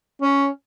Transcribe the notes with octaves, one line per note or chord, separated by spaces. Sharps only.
C#4